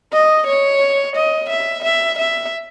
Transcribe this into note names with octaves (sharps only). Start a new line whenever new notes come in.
D#5
C#5
D#5
E5
E5
E5